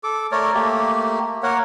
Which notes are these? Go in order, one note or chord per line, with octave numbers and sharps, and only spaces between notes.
A4 D6
A3 A#4 C#5 D5
A3 A#3 G4
A#3 A#4 C#5 F#5